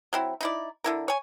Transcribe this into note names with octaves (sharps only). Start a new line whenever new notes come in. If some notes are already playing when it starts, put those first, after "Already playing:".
F#3 C4 E4
D#4 E4 D5
D3 E4 A#4
C#5 G#5